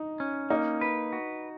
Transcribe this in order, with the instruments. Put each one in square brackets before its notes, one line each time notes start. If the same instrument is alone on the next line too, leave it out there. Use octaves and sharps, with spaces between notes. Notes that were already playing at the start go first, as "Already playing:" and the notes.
Already playing: [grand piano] D#4
[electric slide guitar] C#4
[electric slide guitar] A#3 [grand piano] D#4
[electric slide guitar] B4
F#4